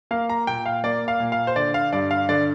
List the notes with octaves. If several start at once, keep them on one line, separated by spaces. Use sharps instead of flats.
A#3 F5
A#5
A#2 G5
F5
A#3 D5
F5
A#2
F5
C5
D3 D5
F5
G2 D5
F5
D3 D5